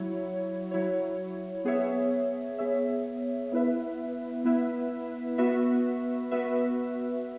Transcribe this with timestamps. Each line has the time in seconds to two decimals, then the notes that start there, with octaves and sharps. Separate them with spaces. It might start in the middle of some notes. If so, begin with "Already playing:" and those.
Already playing: F#3 E4 C#5
0.71 F#3 E4 C#5
1.65 B3 G#4 C#5 E5
2.58 B3 G#4 C#5 E5
3.52 B3 E4 B4 E5
4.44 B3 E4 B4 E5
5.38 B3 F#4 B4 E5
6.31 B3 F#4 B4 E5